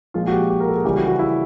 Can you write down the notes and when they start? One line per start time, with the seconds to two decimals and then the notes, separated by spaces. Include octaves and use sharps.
0.14 A#2 F3 G#3 F4
0.27 F#4
0.32 G4
0.50 G4
0.60 A#4
0.68 A4
0.76 G#4
0.84 C#3 E3 G3 G4
0.97 F#4
1.08 F#4
1.19 E4